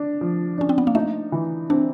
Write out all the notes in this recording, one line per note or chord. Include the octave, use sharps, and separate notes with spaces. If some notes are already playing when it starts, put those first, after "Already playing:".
Already playing: D4
F3
C#4 D4
C4
B3
A#3
A3 D#4
E3
C4 D4